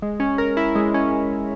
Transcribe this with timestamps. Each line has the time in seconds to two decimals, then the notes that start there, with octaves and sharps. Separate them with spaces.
0.02 G#3
0.20 C#4
0.38 A#4
0.57 E4
0.75 G#3
0.94 C#4